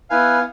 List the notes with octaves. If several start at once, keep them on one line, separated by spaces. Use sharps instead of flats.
B3 E4 B4 F5 G#5